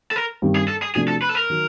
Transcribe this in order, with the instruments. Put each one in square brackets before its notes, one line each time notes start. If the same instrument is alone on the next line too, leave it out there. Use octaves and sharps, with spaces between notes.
[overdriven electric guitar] A4
A#4
[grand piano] G2 D#3 G3 C4
[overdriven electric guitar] G#4
A4
G#4
[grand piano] C3 F3 A3 D4 F#4 [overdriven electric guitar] G#4
[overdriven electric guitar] A4
B4
A4
A#4
[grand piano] D#3 F#3